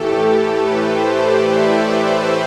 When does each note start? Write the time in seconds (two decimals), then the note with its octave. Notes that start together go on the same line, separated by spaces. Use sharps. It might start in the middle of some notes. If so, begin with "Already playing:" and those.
Already playing: A2 E3 A3 G4 A4
0.20 A4
0.50 B4
0.81 C5
1.11 D5
1.42 E5
1.72 D5
2.02 C5